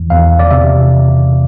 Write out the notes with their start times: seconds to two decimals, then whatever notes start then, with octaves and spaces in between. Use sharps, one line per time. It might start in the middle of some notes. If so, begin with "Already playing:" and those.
Already playing: E2 E3
0.10 E2 F5
0.39 D5
0.51 C3 E5